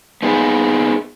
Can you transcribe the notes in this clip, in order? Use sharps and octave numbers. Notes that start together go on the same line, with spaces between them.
B3 D#4 G#4